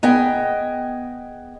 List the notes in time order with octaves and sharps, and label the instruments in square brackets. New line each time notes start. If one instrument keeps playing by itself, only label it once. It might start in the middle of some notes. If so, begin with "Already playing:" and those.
[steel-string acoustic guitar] B3 G#4 D#5 G5